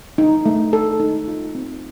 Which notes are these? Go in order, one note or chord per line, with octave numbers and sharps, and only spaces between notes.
D#4
A3
A4
D#4
F4
C4